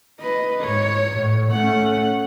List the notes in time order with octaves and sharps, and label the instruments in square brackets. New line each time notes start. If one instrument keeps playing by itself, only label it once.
[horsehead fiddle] B4 D#5
[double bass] G#2 [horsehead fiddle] C#5
[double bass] A2
[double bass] A3 C#4 [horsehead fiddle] F#5